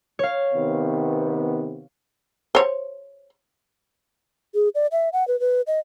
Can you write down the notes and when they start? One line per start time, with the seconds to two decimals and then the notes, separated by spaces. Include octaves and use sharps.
0.19 C#5 F5
0.54 C3 D#3 B3
2.55 C5 C#5
4.53 G#4
4.75 D5
4.92 E5
5.13 F#5
5.28 B4
5.40 B4
5.67 D#5